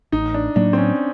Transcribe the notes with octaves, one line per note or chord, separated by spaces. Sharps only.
A1 D#4
D4
A2 F#3 A#3 D4
C4
C#4